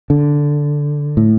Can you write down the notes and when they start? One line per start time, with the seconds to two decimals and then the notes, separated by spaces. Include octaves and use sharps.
0.10 D3
1.17 A2